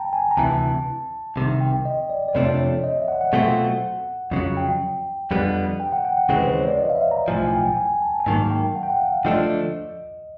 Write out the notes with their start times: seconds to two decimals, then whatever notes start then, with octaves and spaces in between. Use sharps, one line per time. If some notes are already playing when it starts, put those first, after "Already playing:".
Already playing: G5 A5 A#5
0.13 G#5
0.31 A#5
0.37 D2 C3 E3 A5
1.36 C2 C3 D#3
1.61 G5
1.85 D#5
2.10 D5
2.28 D5
2.35 F2 C3 F3 A3 D4 C#5
2.55 C#5
2.60 D5
2.84 D#5
2.97 E5
3.08 F#5
3.21 F#5
3.33 B2 F#3 A3 C4 F4
4.31 F2 C#3 F#3
4.57 G5
5.31 F2 D3 G3 B3
5.80 G5
5.92 F#5
6.05 G5
6.17 F#5
6.29 D#2 C#3 E3 G#3 C4
6.38 B4
6.47 C5
6.58 C#5
6.68 D5
6.78 D#5
6.89 F5
6.95 E5
7.11 A#5
7.28 B1 A2 F3 G#5
7.44 G#5
7.52 G5
7.77 G#5
8.02 A5
8.20 G#5
8.26 G#2 D#3 F#3 A#3 A5
8.51 G5
8.75 F#5
8.83 G5
8.90 F#5
9.00 F5
9.25 D3 F3 A3 D4 D#5